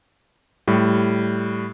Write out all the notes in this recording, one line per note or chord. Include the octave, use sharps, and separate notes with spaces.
A2 G3